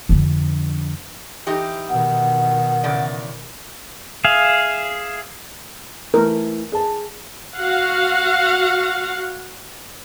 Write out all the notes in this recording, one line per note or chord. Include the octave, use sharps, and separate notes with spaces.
F2 D3
E3 D#4 G4
B2 D#3 F#5
E2 C#3 D5
G#4 E5 F5
E3 A3 A#4
G#4 A5
F#4 F5 F#5